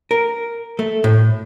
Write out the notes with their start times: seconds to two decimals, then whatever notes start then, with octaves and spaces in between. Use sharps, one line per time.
0.11 A#4
0.79 A3
1.04 A2